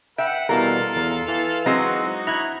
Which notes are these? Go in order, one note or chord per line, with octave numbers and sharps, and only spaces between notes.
B4 E5 F#5 G5
B2 E3 G3 F4 A4 A#4 F5
E2
E3
F#3 G#3 C4 D#4 F#4
E4 A#5 F#6 G#6